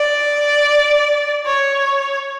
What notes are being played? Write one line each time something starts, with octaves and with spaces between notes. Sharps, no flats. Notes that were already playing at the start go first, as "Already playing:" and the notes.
Already playing: D5
C#5